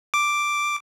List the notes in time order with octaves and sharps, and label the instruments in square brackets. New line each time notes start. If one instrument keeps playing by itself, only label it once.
[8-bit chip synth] D6